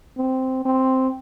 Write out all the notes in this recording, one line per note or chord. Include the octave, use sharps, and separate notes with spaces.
C4
C4